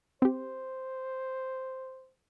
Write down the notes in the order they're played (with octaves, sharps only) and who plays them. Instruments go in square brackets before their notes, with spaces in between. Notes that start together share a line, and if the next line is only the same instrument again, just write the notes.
[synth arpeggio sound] C4 G4 [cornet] C5